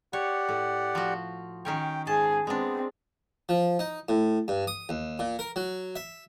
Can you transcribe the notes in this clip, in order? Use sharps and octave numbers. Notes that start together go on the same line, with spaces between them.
G4 C#5 D5 F#5
A2
F3 F#4
D#3 C#4 C#5 G5
G#2 G#4 A5
G#3 B3 C4 D4
F3
D#4
A2
G2
D#6
D#2
A#2
A#4
F#3
E5